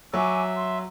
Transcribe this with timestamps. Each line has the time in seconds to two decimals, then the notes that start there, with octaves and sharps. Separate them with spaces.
0.14 F#3 E5 G#5 C#6 D6
0.55 C6